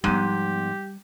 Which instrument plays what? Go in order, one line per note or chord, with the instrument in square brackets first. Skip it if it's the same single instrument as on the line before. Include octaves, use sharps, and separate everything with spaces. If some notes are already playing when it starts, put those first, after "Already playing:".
[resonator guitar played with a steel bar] G#2 [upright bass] F3 B3 [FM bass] G3 [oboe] G4